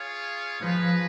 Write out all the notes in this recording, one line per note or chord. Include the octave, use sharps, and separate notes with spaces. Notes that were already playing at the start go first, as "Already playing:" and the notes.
Already playing: F4 G#4 C#5 F5
F3 D#4 G#4 B4